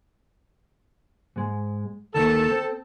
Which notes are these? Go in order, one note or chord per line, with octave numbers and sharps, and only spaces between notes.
G#2 G#3
D2 D#3 A#3 A4
C4